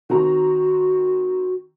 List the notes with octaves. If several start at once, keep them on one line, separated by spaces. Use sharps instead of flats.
D#3 C4 F#4 A#5